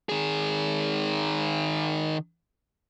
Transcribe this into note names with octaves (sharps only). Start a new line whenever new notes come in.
D#3 G#4